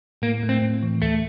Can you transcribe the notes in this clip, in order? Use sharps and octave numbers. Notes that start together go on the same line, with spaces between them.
A2 A#3
A3
C4
A2
E3
D2 A3